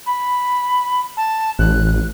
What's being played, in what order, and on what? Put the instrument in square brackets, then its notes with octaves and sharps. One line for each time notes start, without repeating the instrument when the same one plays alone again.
[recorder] B5
A5
[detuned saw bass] A1 [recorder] F#6